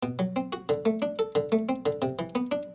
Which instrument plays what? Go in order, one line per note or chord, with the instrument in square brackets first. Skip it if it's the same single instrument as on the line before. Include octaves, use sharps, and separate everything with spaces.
[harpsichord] B2
F#3
C4
F#4
D3
A3
D4
A4
D3
A3
C4
D3
C3
E3
B3
D4